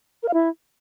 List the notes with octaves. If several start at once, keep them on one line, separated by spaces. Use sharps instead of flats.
A#4
F5
E4